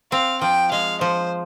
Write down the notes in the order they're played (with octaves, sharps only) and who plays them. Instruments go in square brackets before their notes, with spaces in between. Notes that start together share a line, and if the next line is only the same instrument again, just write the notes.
[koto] C4 [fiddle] F5
[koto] F3 [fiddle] G5
[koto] G#3 [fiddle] F5
[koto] F3 [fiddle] C5